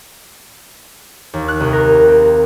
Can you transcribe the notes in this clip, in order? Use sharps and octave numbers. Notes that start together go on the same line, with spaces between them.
D#2
F#6
C2
A#4
C4